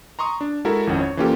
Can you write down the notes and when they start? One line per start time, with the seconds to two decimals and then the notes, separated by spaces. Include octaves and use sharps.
0.19 A#5 C6 C#6 D#6
0.41 D4
0.65 G#3 E4 F#4 A4 A#4 E5
0.87 G#1 F2 C#4 F#5
1.00 C#5
1.17 E3 A#3 C#4 F4 G4 A4